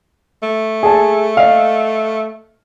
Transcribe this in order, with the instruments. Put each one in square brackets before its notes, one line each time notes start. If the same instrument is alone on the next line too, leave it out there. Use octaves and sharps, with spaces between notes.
[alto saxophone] A3
[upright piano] G#4 A5
D#5 F5